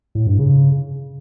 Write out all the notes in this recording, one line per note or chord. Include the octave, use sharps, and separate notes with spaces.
A2
G2
C#3